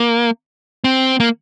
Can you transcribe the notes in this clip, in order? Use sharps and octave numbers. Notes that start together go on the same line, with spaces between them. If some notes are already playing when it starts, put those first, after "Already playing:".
Already playing: A#3
C4
A#3